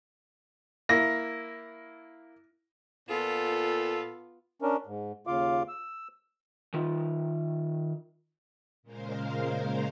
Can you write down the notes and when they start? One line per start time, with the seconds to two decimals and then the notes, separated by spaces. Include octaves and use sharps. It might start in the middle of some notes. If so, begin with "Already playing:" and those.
0.89 A#3 E4 A#6
3.08 A#2 B3 F4 A4
4.62 C#4 D4 A#4
4.86 G#2
5.27 D#2 C#3 F4 F5 D6
5.68 E6
6.74 D#3 F4
8.83 A#2 C#3 G#3 A#4 C5 F5